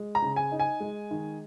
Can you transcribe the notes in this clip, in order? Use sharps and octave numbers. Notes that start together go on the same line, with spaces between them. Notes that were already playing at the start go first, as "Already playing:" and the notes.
Already playing: G#3
A#5
C#3
G#5
D#4
G#5
G#3
D#3